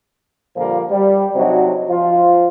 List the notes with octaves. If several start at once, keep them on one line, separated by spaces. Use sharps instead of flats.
A#2 D3 F3 G3 A#3
G3
C3 F#3 C4 D4 D#4 F#4
F3 F4